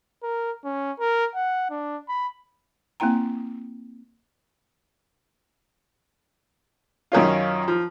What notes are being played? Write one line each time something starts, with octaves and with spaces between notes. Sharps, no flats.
A#4
C#4
A#4
F#5
D4
B5
A#3 C4 E4 G5 A#5
F#2 D#3 C#4 F4
F3